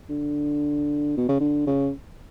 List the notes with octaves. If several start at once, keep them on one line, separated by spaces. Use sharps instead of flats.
D3
B2
C#3
D3
C#3